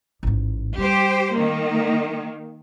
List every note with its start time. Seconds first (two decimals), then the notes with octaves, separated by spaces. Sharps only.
0.23 A1 G#2
0.78 G3 G4 C5
1.34 D#3 A#3